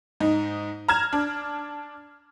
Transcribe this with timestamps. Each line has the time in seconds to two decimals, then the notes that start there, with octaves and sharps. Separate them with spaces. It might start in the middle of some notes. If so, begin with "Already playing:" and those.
0.20 G#2 D#4
0.88 A#5 F6 G#6 E7
1.13 D4